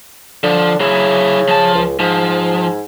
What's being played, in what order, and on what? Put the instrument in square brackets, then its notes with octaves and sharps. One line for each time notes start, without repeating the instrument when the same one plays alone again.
[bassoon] D3 [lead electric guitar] F3
[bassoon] C#3 [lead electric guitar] F#3 E4
[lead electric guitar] F3 A5
[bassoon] C#2
[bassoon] G#2 [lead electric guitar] F3